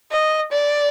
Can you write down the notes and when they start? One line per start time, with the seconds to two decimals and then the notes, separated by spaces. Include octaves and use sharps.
0.12 D#5
0.52 D5